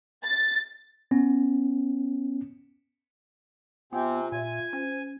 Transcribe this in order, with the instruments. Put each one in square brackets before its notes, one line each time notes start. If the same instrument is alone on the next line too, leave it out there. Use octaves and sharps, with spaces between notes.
[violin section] A6
[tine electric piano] B3 C#4
[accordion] C3 C4 [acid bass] B3 [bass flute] F4 [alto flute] G#5
[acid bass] A#2 [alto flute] E5 [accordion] G#5
[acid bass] C#4 [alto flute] C5